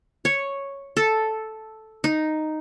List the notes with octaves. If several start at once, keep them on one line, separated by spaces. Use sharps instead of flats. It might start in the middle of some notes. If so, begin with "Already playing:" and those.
C#5
A4
D#4